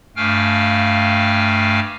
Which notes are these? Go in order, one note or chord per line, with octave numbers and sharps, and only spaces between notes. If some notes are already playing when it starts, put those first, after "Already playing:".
G2 A3 F5 G5 G#5 F6